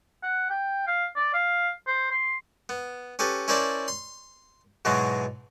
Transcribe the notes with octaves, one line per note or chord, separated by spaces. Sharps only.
F#5
G5
F5
D5
F5
C5
C6
B3
C#4 G4 A4 B4
C#4 E4 A#4 C5 D5 A5
C6
G#2 B2 E3 F#3 G#3